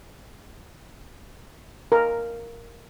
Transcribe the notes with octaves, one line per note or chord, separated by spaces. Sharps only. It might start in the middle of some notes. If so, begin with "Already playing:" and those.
A#4